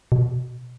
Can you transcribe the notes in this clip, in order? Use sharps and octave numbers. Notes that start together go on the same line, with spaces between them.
B2